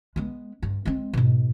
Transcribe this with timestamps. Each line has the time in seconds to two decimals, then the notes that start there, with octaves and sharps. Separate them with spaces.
0.16 G#3 B3
0.63 G2
0.85 G#3 C4
1.13 G#2 B2